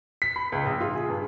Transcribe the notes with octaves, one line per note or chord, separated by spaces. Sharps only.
B6
B5
C#2
A#1
F4
G#4
G2